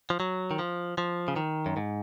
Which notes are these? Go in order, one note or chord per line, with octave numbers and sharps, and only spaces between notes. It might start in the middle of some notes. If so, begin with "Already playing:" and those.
F3
F#3
D#3
F3
F3
C#3
D#3
F#2
G#2